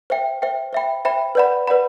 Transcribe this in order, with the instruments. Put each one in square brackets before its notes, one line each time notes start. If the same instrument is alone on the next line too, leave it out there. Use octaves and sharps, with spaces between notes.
[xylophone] C5 E5 G5
C5 E5 G5
C5 E5 G5 B5
C5 E5 G5 B5
B4 D5 F#5 B5
B4 D5 F#5 B5